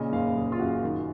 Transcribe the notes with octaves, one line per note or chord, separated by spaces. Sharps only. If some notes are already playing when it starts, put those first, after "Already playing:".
Already playing: A#2 C#3 D#5
F#1 F5
F#1 G#4
F4
F#2 F#4
D#3